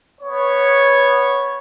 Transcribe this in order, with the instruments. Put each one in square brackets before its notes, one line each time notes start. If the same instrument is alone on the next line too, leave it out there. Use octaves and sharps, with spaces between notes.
[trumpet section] B3 C#5